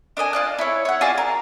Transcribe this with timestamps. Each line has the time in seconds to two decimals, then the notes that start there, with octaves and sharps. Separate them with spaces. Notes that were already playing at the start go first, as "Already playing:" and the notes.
0.17 D4 A#4 D#5 G#5
0.33 F4 D5 F#6
0.59 E4 C#5
0.85 C#5 F#5
1.01 F4 F#4 G#4 D5
1.18 A#4